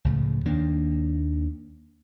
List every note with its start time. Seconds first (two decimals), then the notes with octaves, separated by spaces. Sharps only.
0.05 C#2 A2 C#3 F3
0.45 D#2 D#3 A#3 D4